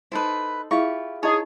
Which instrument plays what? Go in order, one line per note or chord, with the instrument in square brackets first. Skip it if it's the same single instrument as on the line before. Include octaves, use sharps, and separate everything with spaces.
[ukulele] D#4 A4 C5 [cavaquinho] E4 B4
[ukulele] E4 F4 G4 [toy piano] G#4 F5 [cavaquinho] C#6
[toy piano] D#4 E4 D#5 [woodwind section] G#4 [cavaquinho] C#5